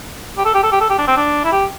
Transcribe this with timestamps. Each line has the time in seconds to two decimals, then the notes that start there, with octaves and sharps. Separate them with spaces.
0.37 G4
0.45 A4
0.54 G4
0.63 A4
0.72 G4
0.81 A4
0.90 G4
0.98 D4
1.07 C4
1.17 D4
1.44 E4
1.52 G4